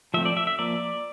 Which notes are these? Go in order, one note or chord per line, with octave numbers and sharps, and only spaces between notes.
F3 A3 C4 E5
D5
E5
E5
F3 A#3 D5